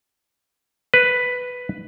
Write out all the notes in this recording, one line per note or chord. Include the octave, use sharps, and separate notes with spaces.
B4